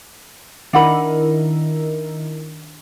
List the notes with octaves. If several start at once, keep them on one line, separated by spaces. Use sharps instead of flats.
D#3 D4 E4 A#4 F#5 B5